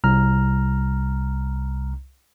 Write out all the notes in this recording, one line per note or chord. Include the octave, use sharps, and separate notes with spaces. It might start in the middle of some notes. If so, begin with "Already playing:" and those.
C2 A#5 F6